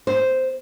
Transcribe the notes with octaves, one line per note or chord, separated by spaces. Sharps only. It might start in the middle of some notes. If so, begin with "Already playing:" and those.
C5